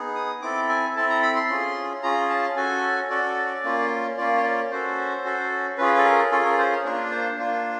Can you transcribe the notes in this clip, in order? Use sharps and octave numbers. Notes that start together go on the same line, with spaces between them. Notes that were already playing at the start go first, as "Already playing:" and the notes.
Already playing: B3 D#4 G#4
D#6
C4 E4 A4 D6
G#5
C4 E4 A4 A5
A#5
B5
C6
C#4 F4 G#4
C#4 F4 G#4 A#5
A5
C#4 F#4 A4 G#5
C#4 F#4 A4 D5
A#3 C#4 F4
A#3 C#4 F4 D5
C#5
D5
C#4 F#4 A4 C5
C#4 F#4 A4
C#4 F4 G#4 B4
A4
A#4
C#4 F4 G#4 A4
A#4
C5
C#5
A#3 D4 F4 A#4
C5
A#3 D4 F4